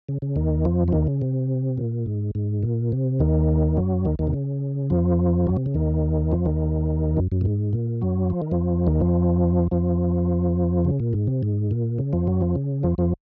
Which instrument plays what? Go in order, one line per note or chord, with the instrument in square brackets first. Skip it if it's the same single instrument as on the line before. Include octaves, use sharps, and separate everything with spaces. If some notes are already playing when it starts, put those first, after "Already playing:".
[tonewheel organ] C#3
C#3
D#2 D#3
F2 F3
F3
D#2 D#3
C#3
C3
A#2
G#2
G#2
A#2
C3
D#2 D#3
F#2 F#3
D#2 D#3
D#2 D#3
C3
C#3
F2 F3
F#2 F#3
C3
C#3
D#2 D#3
F2 F3
D#2 D#3
F#2
F#2
A#2
G#2
A#2
F#2 F#3
F3
D#3
F2 F3
D#2 D#3
F2 F3
F2 F3
C#3
A#2
G#2
C3
G#2
A#2
C#3
F2 F3
F#2 F#3
F2 F3
C#3
F2 F3
F2 F3